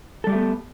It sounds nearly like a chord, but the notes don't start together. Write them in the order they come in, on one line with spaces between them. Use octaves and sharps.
A4 G3 G4 A3 B3